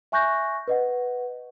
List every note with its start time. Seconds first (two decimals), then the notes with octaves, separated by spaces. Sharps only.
0.12 E5 G#5 C#6 F#6 G6 A#6
0.68 B4 D#5 F#5